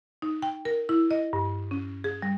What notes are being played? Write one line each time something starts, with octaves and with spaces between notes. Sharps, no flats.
D#4
G5
A#4
E4
D#5
G2
C#4
G#4
G3